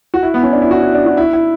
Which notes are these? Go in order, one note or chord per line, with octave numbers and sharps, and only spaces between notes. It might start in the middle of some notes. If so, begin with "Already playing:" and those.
F#4
E4
B3
C#4
D4
E4
F#4
E4
D4
F#4
E4
E4